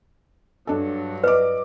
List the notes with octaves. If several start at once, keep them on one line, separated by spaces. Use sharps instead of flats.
G2 F#3 D4 A4
B4 D5 D#5 D6